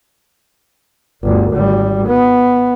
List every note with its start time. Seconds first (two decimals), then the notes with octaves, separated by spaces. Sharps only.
1.23 G1 D2
1.53 G#1 G3
2.07 B3